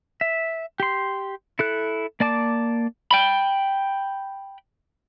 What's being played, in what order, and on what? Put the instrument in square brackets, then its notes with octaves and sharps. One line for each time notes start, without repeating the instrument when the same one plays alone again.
[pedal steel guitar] E5
G4 C6
E4 A4 F#6
A#3 D5 A5 D6
[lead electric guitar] G5 B5